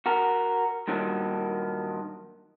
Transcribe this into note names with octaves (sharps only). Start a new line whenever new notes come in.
F#4 A#4
G2 A#2 D#3 F#3